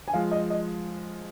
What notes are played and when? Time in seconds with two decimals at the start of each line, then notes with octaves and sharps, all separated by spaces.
0.08 G#5
0.13 F3 G#3 F4 F5
0.31 D#5
0.50 D#5